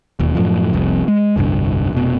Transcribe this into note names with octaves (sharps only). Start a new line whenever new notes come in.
E1 D#2
F#2 A2 F3
F1 C2 F2
G#3
F1 C2 G2 D3
F1 B2